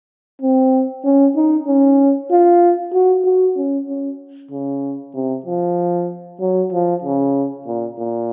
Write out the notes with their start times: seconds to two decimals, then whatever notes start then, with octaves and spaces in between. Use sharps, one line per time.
0.41 C4
1.04 C#4
1.36 D#4
1.67 C#4
2.31 F4
2.94 F#4
3.25 F#4
3.56 C#4
3.88 C#4
4.51 C#3
5.14 C3
5.46 F3
6.40 F#3
6.73 F3
7.04 C#3
7.67 A#2
7.99 A#2